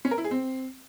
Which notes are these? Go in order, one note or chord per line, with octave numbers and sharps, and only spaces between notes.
C#4
A#4
E4
G#4
C4